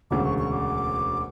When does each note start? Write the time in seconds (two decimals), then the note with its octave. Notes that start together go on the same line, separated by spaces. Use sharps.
0.11 E1 D2 C#3 D6
0.25 C#6
0.38 C#6
0.52 D6